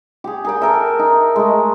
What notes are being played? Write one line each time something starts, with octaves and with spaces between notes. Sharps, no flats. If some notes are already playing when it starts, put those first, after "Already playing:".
G4 G#4
G#4 A#4 G5
A4 A#4 E5
D#4
G#3 A3